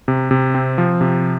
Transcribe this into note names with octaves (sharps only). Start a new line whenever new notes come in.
C3
C3
C4
F3
C3